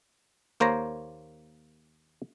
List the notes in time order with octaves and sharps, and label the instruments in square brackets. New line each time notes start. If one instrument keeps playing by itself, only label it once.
[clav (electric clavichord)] D#2 A#3 C5 C#5 A#5